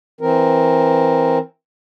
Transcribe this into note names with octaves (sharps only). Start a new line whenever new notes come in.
E3 C4 A#4